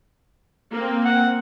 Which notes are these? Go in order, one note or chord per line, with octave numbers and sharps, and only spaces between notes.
A#3 C4
F#5